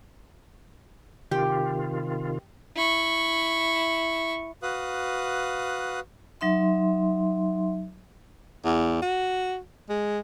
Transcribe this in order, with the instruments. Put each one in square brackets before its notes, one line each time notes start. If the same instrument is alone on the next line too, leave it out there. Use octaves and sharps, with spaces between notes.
[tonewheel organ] C3 D#3 F4 [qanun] G4
[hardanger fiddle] E4 C#6
[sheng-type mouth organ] F#4 B4 F5 D#6 F#6
[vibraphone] F#3 D#4 E5 C6
[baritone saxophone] E2
F#4
G#3